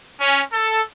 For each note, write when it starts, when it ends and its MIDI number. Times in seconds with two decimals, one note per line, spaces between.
0.20 0.41 61
0.53 0.82 69